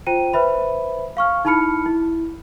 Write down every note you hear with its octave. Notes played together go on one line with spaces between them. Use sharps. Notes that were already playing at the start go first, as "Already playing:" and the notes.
F4 C5 G5 D#7
B4 C5 E5 B5
F5 C#6 F6
D#4 E4 A5 B5 F6 C#7
E4